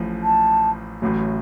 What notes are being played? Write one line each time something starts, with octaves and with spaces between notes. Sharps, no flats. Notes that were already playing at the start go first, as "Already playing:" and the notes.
Already playing: A1 A2 F3
A5
A1 A2 F#3